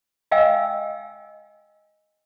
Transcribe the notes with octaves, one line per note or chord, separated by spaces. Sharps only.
D#5 F5 G5 G#5 E6